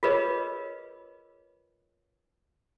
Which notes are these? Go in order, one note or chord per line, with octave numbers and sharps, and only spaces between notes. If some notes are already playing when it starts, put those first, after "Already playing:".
F4 G#4 A#4 B4 C#5 D#5